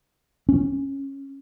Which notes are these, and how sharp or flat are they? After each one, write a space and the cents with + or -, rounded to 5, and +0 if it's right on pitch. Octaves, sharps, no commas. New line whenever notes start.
C#4 -15